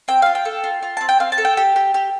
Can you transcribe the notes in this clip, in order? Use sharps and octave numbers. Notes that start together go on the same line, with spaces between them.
C4 G5
F4 F5
G5
A4
F4
F4
C4 A5
G5
C4 F5
A5
A4
G5
G4 G5
G4
G4